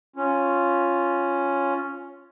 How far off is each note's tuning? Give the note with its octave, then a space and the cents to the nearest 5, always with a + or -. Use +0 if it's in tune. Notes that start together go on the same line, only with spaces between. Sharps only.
C#4 +0 F4 +0